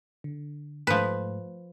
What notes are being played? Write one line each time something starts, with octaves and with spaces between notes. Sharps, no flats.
D3
G#2 F3 A3 B4